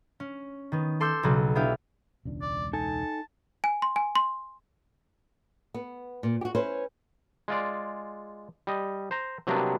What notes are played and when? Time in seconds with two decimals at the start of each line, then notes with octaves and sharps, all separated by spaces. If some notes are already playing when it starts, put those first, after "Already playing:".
0.20 C#4
0.72 D#3 B3
1.00 A4 C6 D6 E6 G6
1.23 B1 C#3 F#3
1.55 B3 D4 E4 G4 E5 F5
2.25 E1 C#2 D4
2.42 D5
2.73 D#4 A4 G#5 A5
3.64 G#5
3.82 C6
3.96 G#5
4.16 C6
5.74 B3
6.23 A#2
6.41 F#4 G4
6.55 C#4 E4 B4 C5
7.48 G#3 F4 D5
8.67 G3 D#5
9.11 C5 A#5
9.47 C3 F#3 G3 A#3 B3 D4